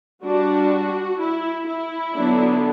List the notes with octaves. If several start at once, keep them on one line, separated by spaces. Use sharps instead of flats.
G3 D4 F#4
E4
E4
D3 F#3 B3 D4